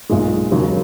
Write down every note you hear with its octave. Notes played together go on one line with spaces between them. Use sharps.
B1 A#2 G#3
E1 D#2 C#3 F#3